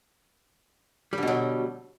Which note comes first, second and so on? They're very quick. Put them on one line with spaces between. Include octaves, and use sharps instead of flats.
G3 D3 B2 F#3